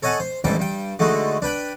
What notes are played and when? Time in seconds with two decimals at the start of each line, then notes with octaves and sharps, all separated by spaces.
0.03 A4 C#5 D#5 F#5 G#5 A5
0.20 C5
0.44 A1 G#2 E3 G3 G5 A5
0.59 G2 G5
0.99 D3 G#3 A3 D#4 F#4
1.42 D4 B4 G5 B5